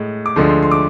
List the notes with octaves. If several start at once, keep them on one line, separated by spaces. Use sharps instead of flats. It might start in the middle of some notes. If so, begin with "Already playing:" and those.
Already playing: A2 G#3
D6
D2 D3 F3 G#3 C6
C6
C6
D6